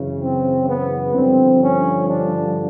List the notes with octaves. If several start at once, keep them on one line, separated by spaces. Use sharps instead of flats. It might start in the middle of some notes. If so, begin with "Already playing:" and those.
Already playing: F#2 C#3 E3
C4
B3
G2 D3 F3 C4
C#4
D4